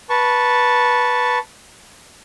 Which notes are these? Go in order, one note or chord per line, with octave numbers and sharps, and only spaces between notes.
B4 A5 C#6